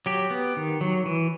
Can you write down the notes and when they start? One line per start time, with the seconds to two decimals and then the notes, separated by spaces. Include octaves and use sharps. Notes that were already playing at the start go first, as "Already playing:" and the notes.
0.06 F#3 G4
0.31 B3
0.57 D#3
0.81 F#3
1.06 E3